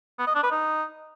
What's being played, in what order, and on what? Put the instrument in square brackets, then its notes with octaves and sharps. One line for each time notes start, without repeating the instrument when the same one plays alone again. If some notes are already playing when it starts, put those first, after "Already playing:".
[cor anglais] B3
D#5
D4
B4
D#4